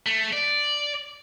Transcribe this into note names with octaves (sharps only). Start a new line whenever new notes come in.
A3
D5